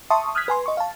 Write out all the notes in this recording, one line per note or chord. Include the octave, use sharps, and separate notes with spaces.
E5 A5 C6 C#6 D#6
D#6 F6 F#6 G#6 B6
B4 G#5 C6
D#5 C#6
F5 A5